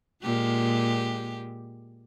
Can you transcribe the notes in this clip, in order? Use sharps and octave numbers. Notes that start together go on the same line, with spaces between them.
A#2 G#3 G4